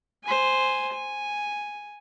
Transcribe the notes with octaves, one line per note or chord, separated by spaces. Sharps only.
C5 G#5
G#5